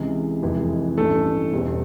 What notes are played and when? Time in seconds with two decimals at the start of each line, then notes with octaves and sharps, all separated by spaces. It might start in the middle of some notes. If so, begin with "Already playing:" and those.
Already playing: C#2 C3 E3 G#3
0.42 F1 F2 C3 E3 G#3
0.98 A1 G2 E3 A3 A4
1.53 E1 E2 B2 G3